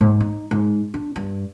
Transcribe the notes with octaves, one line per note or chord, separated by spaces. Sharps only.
G#2
D#4
G#2
D4
G2